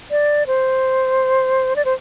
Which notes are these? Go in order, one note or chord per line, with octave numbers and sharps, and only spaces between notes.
D5
C5
D5
C5